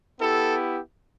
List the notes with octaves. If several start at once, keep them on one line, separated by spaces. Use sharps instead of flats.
B3 E4 G4 A4